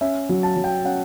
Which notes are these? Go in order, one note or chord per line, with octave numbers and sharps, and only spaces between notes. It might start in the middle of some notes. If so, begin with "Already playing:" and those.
C#4 E5
F#3
A5
F#3
G5
C#4 F#5